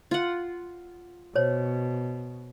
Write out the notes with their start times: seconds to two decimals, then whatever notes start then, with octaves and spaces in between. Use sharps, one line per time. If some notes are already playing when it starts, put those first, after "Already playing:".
0.11 F4 F#5
1.36 B2 C5 C#5